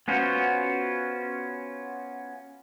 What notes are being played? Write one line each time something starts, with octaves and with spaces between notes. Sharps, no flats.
B3 C#4 F4 F#4 C5